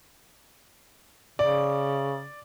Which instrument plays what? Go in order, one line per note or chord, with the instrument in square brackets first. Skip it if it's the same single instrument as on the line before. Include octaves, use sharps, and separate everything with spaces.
[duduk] C#3 [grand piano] D5